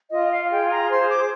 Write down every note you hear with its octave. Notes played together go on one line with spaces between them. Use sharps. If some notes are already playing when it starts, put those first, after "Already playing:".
F4 D#5
F5
G#4 G5
A#5
C5 C6
D6